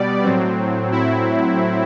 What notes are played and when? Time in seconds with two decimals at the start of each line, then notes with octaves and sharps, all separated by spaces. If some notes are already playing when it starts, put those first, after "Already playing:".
Already playing: B2 G3 B3 D5
0.24 A2 F#3 C4
0.92 E4